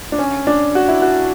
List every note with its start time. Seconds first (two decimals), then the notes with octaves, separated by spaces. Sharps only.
0.12 D4
0.18 C#4
0.47 D4
0.75 F#4
0.88 E4
1.02 F#4